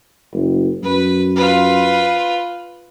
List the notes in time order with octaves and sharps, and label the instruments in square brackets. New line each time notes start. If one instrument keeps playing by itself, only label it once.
[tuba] F#1
[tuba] F#2 [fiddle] B4
[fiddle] F4 B4